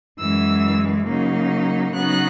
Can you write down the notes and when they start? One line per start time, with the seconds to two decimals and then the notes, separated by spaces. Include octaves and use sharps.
0.19 F#2 E3 G#3 E6
1.07 C#3 F#3 A#3 D#4
1.94 C#3 F#3 B3 D#4 F#6